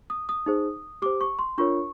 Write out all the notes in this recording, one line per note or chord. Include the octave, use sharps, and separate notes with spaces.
D#6
D#6
D#4 G#4 C5
G4 C5 D6
C#6
C6
D4 F4 A#4 C#5 C#6